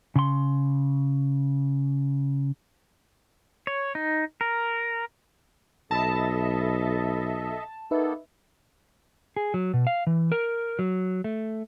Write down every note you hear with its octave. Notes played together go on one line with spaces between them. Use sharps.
C#3 C6
C#5
D#4
A#4
B1 A4 D#5 E5 A5 B5 A#6
A#3 B3 D#4 A4 B4 E5
G#4
F#3
B2
F5
E3
A#4
F#3
A3